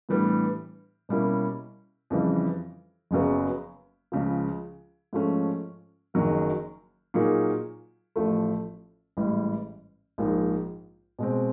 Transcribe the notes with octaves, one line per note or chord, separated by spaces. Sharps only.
A2 E3 G3 B3 D4
B2 G3 A#3 C#4 E4
F2 C#3 E3 G3
F#1 F#2 C#3 F#3 B3
C#2 C#3 F3
G#2 F3 A3 C#4
F#1 F#2 D#3 F#3 A#3
A#2 F#3 A#3 D#4 G#4
A1 A2 F3 A3
A1 G#2 E3 G3
A#1 G#2 F3 A#3 D#4
B2 G#3 C4